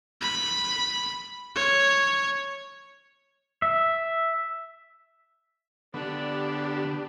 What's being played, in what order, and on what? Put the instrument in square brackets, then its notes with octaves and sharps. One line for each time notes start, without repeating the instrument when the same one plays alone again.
[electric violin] B5
C#5
[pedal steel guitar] E5
[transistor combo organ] D3 B3 [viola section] D4 G4